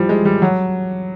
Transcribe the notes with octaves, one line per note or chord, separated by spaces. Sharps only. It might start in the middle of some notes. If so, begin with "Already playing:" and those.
Already playing: E3 F3 G3
G#3
G3
F#3